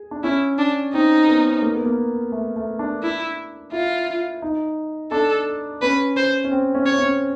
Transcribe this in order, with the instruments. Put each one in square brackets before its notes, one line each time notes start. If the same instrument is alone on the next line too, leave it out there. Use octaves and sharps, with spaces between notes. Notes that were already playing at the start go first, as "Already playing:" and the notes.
Already playing: [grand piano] G#4
D4
[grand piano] C#4 [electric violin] E4
[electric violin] D4
[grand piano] C4 [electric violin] D#4
[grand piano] B3
A#3
B3
A#3
A3
A3
D4
[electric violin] E4
[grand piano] E4 [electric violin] F4
[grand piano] D#4
[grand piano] D4 [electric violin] A4
[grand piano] C#4 [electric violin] B4
[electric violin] C5
[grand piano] C#4
C4
C#4
[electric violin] C#5
[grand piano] C#4